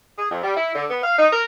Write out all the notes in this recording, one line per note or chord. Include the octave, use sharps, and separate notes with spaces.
G#4
F2
G3
E4
D3
B3
F5
D#4
A#4